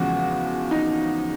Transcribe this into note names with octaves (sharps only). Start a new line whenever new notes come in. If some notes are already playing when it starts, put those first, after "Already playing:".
Already playing: E2 C#3 F3 G#3 F#4
D#4